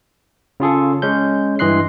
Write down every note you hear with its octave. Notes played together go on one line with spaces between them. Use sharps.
C#3 F4 G#4 A4
G#3 C#4 G6
G2 E3 D#5 C6 F#6 C7